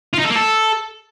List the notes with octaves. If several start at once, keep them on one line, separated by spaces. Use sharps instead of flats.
F4
D#4
A4
A#3
A4